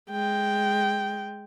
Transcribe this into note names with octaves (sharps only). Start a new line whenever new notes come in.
G#3 G5